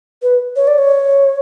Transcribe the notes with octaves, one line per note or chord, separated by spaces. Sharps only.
B4
C#5
D5
C#5